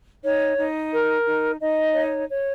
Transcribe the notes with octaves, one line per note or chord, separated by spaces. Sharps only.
D#4 C#5
D#4
A#4
D#4
D#4 D#5
C#5
C#5